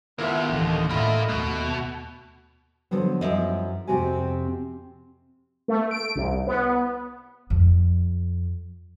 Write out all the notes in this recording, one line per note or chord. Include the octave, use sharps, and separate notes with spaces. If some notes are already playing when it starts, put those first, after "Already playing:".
D#2 A#3 B3 E4 F4 E5 F#5
D1 D3 E3 D#5
A2 A#3 F4 E5 B5
D#2 B2 A3
D3 F3 F#3 B3
F#2 F3 E4 D#5
F2 C3 C4 F#4 G4 G#5
A3
D7
C2
B3
F2